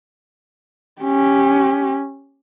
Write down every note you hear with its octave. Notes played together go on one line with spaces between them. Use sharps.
C#4 G4